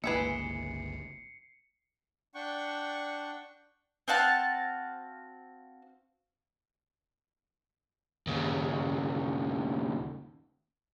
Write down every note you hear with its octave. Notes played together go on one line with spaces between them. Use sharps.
G1 C#2 E3 G#3 A#3 E5 C7 C#7
D4 F#5 G5 C#6
C4 F#4 F5 A5
D#2 C#3